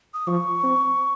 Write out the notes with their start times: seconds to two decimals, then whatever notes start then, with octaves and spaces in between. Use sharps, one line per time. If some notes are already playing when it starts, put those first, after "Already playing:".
0.14 D#6
0.27 F3 C#6
0.63 C4